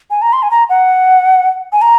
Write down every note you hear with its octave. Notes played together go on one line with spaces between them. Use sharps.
G#5
A#5
C6
G#5
A#5
F#5
G#5
A#5